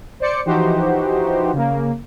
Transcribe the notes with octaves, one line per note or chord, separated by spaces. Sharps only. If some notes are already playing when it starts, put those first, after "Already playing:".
C5 D5 C#7
E3 F3 D#4 F#4 G4 C5
C#3 A#3